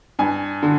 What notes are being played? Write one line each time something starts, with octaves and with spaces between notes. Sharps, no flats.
G2 G#5
D3